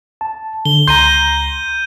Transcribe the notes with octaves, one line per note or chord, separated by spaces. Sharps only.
A5
D3 G7
C#2 A#5 C6 G6 D#7 G7